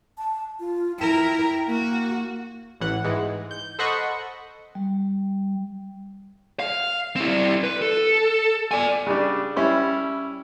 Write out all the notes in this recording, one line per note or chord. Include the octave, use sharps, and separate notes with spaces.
A5
F4
E4 A#4 G5
A#3 F#4
A1 E3 F#5
G#2 E3 G#3
G6
A4 C5 D#5 F#5 B5 C#6
G3
F5
C4 E4
B4
A4
D5 G#5
C#3 G3 D4
G3 C#4 E4